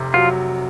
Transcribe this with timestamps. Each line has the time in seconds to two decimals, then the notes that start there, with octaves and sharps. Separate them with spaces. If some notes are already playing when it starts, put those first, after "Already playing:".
Already playing: F1 C3
0.14 F#3 F4